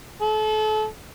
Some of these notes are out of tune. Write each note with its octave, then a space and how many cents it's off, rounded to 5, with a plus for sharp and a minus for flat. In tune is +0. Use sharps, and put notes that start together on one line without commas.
A4 -35